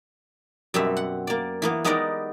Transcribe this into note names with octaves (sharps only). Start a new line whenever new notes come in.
F#2 B2 G3 C4 E5
F#5
A#3 D5
E3 A#3 B3
G#3 B3 D#4 G4 A#4 D5